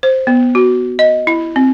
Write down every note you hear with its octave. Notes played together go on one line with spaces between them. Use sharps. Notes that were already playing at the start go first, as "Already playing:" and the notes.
C5
B3
F#4
D#5
E4
C4